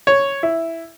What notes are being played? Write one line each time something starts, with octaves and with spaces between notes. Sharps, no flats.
C#5
E4